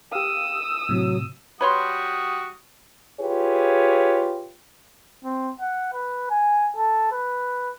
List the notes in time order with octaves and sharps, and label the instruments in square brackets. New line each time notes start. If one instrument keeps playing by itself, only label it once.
[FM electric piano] G4 F5 [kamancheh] D#6 E6
[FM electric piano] A2 C3 [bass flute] F#3
[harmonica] G3 F#4 D#6 [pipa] B4 C#5 C6
[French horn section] F4 G4 G#4 B4 C#5
[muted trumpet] C4
F#5
B4
G#5
A4
B4